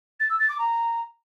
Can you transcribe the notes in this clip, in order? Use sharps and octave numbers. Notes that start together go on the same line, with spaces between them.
A6
E6
A6
D6
A#5